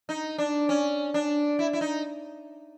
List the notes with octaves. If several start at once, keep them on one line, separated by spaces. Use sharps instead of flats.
D#4
D4
C#4
D4
E4
E4
D#4